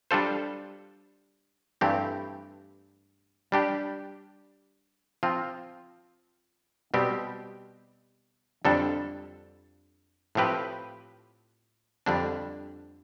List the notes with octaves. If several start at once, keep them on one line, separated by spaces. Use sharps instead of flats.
G3 D4 F4 A4 C5
G2 E3 A3 C4 G4
G3 D4 G4
F3 C4 F4
B2 G3 C4 G4
F2 D3 G3 D4 A4
A2 F3 C4 G4 B4
F2 D3 G3 D4